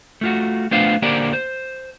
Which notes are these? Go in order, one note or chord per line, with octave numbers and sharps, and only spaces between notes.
A3 F4 F#4
A3 B3 D4 F4 C5 F5
D3 A#3 G4 A#4 C5 D5
C5